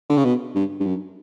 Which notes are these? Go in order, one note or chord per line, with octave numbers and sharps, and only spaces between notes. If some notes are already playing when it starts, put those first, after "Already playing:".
D3
C#3
B2
G2
G2
F#2